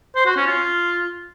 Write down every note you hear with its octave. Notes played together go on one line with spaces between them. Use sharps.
C5
F#4
C#4
F4